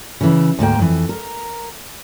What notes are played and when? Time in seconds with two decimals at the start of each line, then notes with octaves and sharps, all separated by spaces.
0.21 C#3 E3
0.59 D2 G#2 A#3 G5
0.79 F2 E3
1.09 A#4